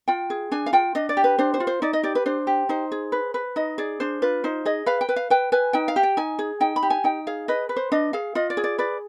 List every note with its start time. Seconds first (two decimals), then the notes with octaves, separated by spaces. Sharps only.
0.08 F4 G5
0.30 G#4
0.51 D4 G#5
0.66 F5
0.73 F4 G5
0.95 D4 D#5
1.09 D5
1.17 G4
1.24 B4
1.38 D4 C5
1.54 C5
1.60 F4
1.67 C5
1.82 D#4 D5
1.93 D#5
2.03 G4 D5
2.15 B4
2.26 D4 C5
2.47 G4
2.69 D#4 C5
2.92 G#4
3.12 B4
3.34 B4
3.56 D#4 D#5
3.78 G#4 D5
4.00 D4 C5
4.22 F4 B4
4.44 D#4 C5
4.65 G#4 D#5
4.86 B4 F5
5.01 G5
5.09 B4
5.16 F5
5.30 B4 G5
5.52 B4 G#5
5.73 D#4 G5
5.88 F5
5.96 G4
6.03 G5
6.17 D#4 G#5
6.39 G#4
6.60 D#4 G5
6.76 B5
6.83 G4
6.90 G#5
7.04 D#4 G5
7.27 G#4 F5
7.48 B4 D#5
7.69 B4
7.76 C5
7.92 D4 D#5
8.13 G#4 F5
8.35 F4 D#5
8.50 D5
8.57 G#4
8.64 D5
8.78 B4 D5